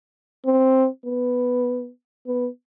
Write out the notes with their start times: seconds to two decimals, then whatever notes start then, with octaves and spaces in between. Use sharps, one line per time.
0.46 C4
1.06 B3
2.27 B3